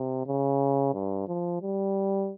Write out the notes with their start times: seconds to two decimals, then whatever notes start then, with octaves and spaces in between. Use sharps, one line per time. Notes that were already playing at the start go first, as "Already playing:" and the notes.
Already playing: C3
0.26 C#3
0.94 G2
1.28 F3
1.61 G3